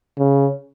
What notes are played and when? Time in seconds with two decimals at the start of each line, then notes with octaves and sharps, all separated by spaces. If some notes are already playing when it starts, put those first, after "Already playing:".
0.18 C#3